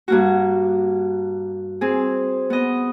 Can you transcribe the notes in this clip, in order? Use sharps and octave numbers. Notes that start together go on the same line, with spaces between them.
G2 A#3 F#4
C4 G#4
B3 D#5